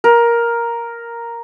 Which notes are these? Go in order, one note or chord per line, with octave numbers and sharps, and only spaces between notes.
A#4